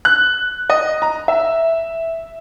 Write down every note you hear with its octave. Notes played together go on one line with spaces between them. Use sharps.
F#6
D#5
A#5
E5